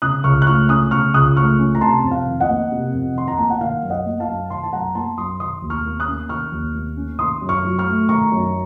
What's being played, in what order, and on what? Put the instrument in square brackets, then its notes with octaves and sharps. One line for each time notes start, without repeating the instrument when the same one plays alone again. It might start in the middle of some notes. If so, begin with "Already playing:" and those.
[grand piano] C#3 D#6 F#6
C#2 C#6 F6
F#6
A3 C#6 F6
C#4 D#6 F#6
C#3 C#6 F6
C#2 D#6 F#6
A3 C#6 F6
C#4
A#5
C3 A5 C6
F2
F5
D#3
D#5 F#5
A#3
C3
F2
D#3 C6
A#5
A#3 A5
F#5
D#3 F5
F#2
D#5 F#5
A#3
F5 A5
F#2
D#3 A5 C6
A5
F#2 F#5 A#5
A#3 A5 C6
F#2 C6 D#6
D#3 C6 D#6
D#2
C#6 F6
A#3
D#6 F#6
C#4
D#3 C#6 F6
D#2
A#3
C#4
D#3 C6 D#6
F#2
C#6 F6
F#3
C#6 F6
A3
D#3 A#5 C#6
F#2